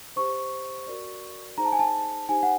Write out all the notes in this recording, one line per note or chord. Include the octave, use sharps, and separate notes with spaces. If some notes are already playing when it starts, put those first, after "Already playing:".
G4 C5 C#6
F#4 A#4 D5
D#4 G#4 C5 A#5
A5
G#5
A5
D#4 G4 C5 G#5
F#5